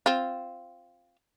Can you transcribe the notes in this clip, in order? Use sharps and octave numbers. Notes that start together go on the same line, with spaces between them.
C4 F4